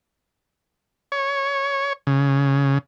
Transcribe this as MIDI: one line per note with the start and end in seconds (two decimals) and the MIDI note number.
1.12 1.93 73
2.07 2.78 49